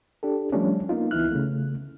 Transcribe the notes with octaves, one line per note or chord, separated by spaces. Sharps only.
D4 G4 A4
F3 G3 A3 C#4 D4
A#3 B3 D#4 F4
C#2 E3 B3 E4 F6 F#6
C#3 A3